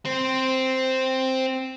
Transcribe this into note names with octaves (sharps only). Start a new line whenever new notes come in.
C4 C5